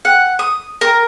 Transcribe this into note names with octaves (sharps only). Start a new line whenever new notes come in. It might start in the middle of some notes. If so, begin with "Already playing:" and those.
F#5
D#6
A#4